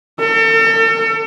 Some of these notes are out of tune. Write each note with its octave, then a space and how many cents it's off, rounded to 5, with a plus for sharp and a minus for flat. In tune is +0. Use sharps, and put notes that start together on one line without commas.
A4 +40